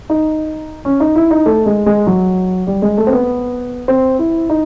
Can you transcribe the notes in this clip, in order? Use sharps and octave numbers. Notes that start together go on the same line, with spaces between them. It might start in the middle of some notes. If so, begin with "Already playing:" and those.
D#4
C#4
D#4
E4
D#4
A3
G#3
G#3
F#3
G3
G#3
A3
C4
B3
C4
E4
D#4